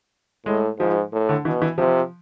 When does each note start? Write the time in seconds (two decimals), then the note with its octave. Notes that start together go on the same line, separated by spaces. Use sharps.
0.46 A2 G#3
0.79 G#2 F3
1.12 A2
1.29 D3
1.45 B2 E3
1.62 E3
1.78 C3 F3